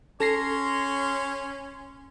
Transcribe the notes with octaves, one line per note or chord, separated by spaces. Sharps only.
C#4 A4 C#5 C6 A#6 C7